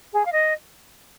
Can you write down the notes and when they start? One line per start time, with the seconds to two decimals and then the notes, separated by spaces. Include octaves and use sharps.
0.13 G#4
0.25 F5
0.32 D#5